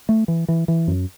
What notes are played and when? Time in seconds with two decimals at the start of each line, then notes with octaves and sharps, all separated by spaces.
0.09 A3
0.28 E3
0.48 E3
0.68 E3
0.88 F#2